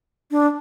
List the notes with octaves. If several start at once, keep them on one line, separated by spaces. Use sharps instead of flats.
D4